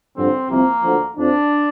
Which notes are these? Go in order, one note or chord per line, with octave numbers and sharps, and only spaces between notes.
G2 D3 F3 C4
C2 C3 F3 A#3
D2 D3 F3
F2 F3 D4